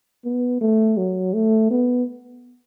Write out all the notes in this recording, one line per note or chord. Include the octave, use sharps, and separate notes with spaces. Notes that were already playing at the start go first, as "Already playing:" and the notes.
B3
A3
F#3
A3
B3